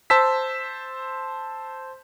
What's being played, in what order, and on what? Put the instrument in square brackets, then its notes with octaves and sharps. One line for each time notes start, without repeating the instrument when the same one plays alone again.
[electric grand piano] C5 A5 E6 B6